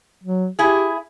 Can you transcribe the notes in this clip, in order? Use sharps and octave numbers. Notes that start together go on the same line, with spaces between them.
F#3
E4 G4 G#4